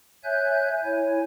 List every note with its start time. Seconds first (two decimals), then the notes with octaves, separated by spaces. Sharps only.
0.24 C#5 E5 G#5 F#6 G6
0.83 E4 C#5 G#5